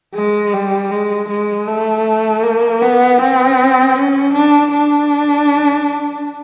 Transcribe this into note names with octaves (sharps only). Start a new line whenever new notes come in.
G#3
G3
G#3
G#3
A3
A#3
B3
C4
C#4
D4
D4